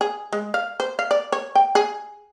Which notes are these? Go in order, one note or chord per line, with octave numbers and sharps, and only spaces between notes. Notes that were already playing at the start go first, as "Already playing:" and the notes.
G#4
G#3
F5
C5
F5
D5
C#5
G5
G#4